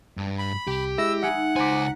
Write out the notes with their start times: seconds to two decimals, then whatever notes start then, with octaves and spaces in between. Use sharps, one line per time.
0.17 G2
0.39 B5
0.68 C2 G4
0.98 G#3 E4 E6 A#6
1.23 G#3 D#4 E5 F#5 G#5
1.56 C#2 C5 C#5 G#5 A#5 D6 B6